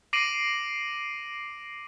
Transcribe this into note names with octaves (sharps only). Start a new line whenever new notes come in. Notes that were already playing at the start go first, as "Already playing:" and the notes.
D6 A#6 C7 D7 D#7 F#7